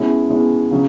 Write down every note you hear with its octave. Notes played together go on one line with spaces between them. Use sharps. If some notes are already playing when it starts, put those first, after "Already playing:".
Already playing: B2 G#3 C#4 E4
B2 G#3 C#4 E4
C#3 F#3